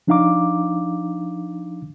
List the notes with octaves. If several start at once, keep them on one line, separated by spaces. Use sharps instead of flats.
F3 D4 D#4 F5 A#5 D6